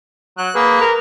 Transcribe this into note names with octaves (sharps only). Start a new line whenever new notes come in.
F#3 F#6
A#3 G#4 B4
A#4